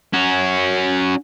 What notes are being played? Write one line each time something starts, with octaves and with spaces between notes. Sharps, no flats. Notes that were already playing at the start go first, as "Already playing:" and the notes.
C#4 F#4